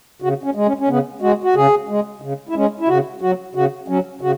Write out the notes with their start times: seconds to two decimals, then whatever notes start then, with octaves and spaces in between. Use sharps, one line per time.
0.22 C#3 F#4
0.44 C#4
0.55 G#3
0.66 C#4
0.80 C#4
0.88 C#3 B3
1.22 G#3 F#4
1.43 F#4
1.55 C#3 G#4
1.89 G#3
2.22 C#3
2.49 E4
2.55 G#3 C#4
2.80 E4
2.88 C#3 F#4
3.21 F#3 F#4
3.55 C#3 F#4
3.88 F#3 C#4
4.21 C#3 F#4